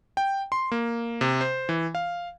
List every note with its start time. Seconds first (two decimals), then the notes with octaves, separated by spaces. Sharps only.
0.17 G5
0.52 C6
0.72 A#3
1.21 C3
1.41 C5
1.69 E3
1.95 F5